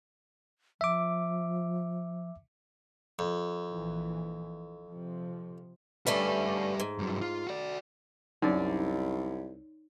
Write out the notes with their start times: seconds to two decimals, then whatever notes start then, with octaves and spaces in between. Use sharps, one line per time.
0.81 F3 E5 D6
3.19 F2
3.70 A#1 E3
4.87 C3 F3
6.07 D3 G3 A3 C#4 B4
6.80 G#2
6.99 G2 F#3
7.21 F4
7.47 F#4 D5
8.42 C2 F#2 D#4 D5